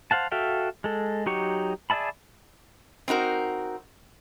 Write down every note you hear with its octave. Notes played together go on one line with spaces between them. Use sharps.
C5 F5 F#5 A5
F#4 A4 E5 F5 G5
G#3 A4
F#3 D#4 G4 C#6
G#4 D5 E5 A5 B5
C4 D#4 F#4 A#4